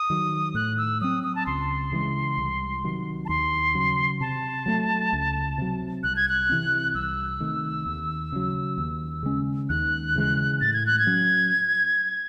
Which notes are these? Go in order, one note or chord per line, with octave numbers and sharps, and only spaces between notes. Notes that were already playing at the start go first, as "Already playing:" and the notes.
Already playing: D#6
D#3 F#3
A2 F#6
E6
F#3 C4 D#6
D#6
A5
C#2 C6
C#3 E3 G#3
C2
C3 D#3 F#3
A5
D#2 C6
C#3 F#3
C3 A5
F#3 A3
C#2
C3 F#3
C2 F#6
G#6
F#6
C3 E3 C4
C2 E6
C3 D#3 A3
D#2
C#3 F#3
D#2
C#3 G#3 C#4
D#2 F#6
C#3 E3 G#3
A2 A6
G#6
F#6
G#6
F#3 C#4